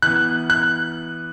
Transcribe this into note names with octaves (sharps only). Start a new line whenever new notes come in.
E3 B3 F#6
F#6